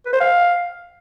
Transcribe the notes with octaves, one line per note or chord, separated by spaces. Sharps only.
B4
C5
F5